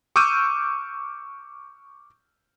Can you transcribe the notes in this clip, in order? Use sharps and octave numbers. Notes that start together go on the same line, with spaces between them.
C#6 D6 E6 F6 G6 D#7